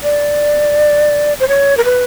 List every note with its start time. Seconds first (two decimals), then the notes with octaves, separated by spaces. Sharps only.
0.03 D5
1.40 C5
1.48 C#5
1.77 A#4
1.84 B4